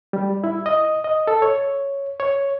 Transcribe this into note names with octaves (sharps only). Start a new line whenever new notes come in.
G3
E4
D#5
D#5
A4
C#5
C#5